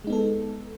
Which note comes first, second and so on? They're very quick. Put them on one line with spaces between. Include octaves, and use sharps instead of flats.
G#3 D#4 B3 A4